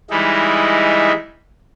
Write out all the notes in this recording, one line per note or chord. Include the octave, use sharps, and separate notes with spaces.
E3 G3 G#3 D#4 E4